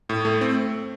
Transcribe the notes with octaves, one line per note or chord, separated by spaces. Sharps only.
A2
A3
C4